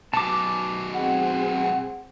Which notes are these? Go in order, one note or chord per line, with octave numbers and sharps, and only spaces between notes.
F#2 B2 A5 D6
C4 G#4 F#5